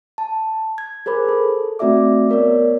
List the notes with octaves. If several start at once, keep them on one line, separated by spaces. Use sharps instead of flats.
A5
G#6
G#4 A#4 C5 B5 D6
A4
A3 C4 F#4 D5 E5 D6
B3 A#4 C#5 D5